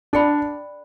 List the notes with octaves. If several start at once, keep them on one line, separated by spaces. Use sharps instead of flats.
D4 A4 D5 G5 B5